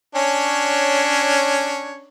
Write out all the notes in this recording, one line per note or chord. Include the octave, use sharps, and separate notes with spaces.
C#4 D4 C#5